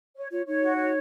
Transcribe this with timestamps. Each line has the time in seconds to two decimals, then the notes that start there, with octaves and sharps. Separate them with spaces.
0.16 C#5
0.31 F4 C#5
0.46 D#4 C#5
0.63 F#4
0.77 C#5